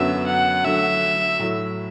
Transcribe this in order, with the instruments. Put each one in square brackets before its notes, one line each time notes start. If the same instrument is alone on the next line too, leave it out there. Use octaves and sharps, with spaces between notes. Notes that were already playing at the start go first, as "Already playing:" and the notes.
Already playing: [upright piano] F#2 D3 F#3 B3 [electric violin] E5
[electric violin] F#5
[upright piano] D3 F#3 A3 [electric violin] E5
[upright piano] A2 F#3 A3 E4